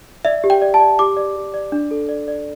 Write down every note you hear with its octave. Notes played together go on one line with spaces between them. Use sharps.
D5 E5
G4
G5
D5
A5
D5
G4 D6
D5
G4
D5
D4
A4
D5
D5